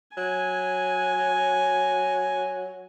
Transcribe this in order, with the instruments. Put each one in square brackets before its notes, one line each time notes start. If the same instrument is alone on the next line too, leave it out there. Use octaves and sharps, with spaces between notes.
[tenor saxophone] F#3 [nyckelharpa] G#5